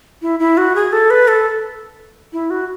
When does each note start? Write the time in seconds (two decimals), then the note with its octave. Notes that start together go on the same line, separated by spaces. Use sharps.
0.22 E4
0.40 E4
0.57 F#4
0.75 G#4
0.92 A4
1.10 B4
1.28 A4
2.33 E4
2.50 F#4